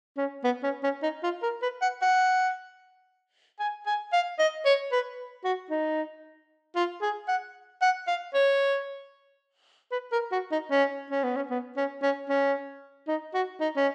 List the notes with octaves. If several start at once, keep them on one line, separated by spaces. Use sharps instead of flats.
C#4
B3
C#4
C#4
D#4
F4
A#4
B4
F#5
F#5
G#5
G#5
F5
D#5
C#5
B4
F#4
D#4
F4
G#4
F#5
F#5
F5
C#5
B4
A#4
F#4
D#4
C#4
C#4
B3
C#4
B3
C#4
C#4
C#4
D#4
F#4
D#4
C#4